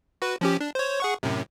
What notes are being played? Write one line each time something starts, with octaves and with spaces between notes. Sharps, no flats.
F#4 B4
F3 C#4 G4
D4
C5 C#5
G#4 F#5 C#6
F#2 A2 C3